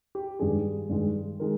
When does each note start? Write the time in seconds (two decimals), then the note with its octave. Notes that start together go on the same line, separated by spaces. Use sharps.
0.15 G4
0.39 G2 D#3 G#3 G#4
0.89 G2 D#3 G#3
1.40 D#3 G#3 A#4